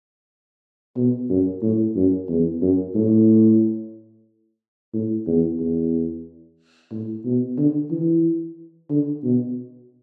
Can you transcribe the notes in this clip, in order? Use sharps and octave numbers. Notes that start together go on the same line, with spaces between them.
B2
F#2
A2
F#2
E2
F#2
A2
A2
E2
E2
A2
B2
D3
E3
D3
B2